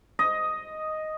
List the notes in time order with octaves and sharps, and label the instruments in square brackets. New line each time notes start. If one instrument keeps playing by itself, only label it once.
[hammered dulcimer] D#5